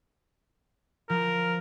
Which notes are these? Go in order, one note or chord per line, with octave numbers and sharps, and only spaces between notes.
F3 A#4